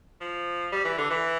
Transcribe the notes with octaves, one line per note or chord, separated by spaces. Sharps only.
F3
G3
E3
D3
E3